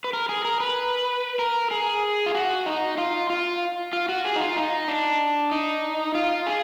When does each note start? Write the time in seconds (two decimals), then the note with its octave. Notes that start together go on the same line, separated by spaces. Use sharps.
0.04 B4
0.13 A#4
0.29 G#4
0.45 A#4
0.60 B4
1.39 A#4
1.71 G#4
2.26 F4
2.35 F#4
2.66 D#4
2.98 F4
3.30 F4
3.93 F4
4.09 F#4
4.25 G#4
4.36 D#4
4.40 F4
4.57 D#4
4.88 D4
5.51 D#4
6.15 F4
6.46 G#4